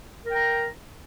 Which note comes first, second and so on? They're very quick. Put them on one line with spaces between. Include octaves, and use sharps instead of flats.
A#4 G5 A#5